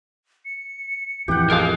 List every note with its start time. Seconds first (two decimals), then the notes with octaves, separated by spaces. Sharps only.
0.45 C#7
1.28 A1 F2 E3 G4 F#5 G6
1.50 F3 G#3 G#4 A#4 F5